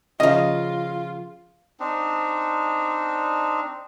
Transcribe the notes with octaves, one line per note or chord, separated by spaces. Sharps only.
C#3 F3 F4 D#5
C4 D4 D#4